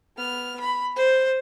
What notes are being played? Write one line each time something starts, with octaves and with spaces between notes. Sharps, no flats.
B3 F6
B5
C5